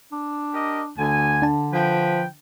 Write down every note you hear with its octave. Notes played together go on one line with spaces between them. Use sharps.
D4
G4 A#4 D#5
D2 D3 G#5
D4 A5
F3 B4 G5